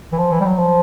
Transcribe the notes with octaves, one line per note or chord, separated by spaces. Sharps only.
E3
F3
E3
G3
F#3
F3